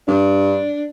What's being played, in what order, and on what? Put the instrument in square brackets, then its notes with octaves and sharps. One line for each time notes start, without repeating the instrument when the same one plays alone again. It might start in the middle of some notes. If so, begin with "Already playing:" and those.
[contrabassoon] G2 [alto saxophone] D4